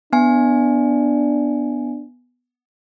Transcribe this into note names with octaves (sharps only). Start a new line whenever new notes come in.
B3 D4 G#5